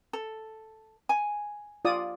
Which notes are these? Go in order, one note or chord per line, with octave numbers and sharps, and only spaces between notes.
A4
G#5
F4 D5 D#6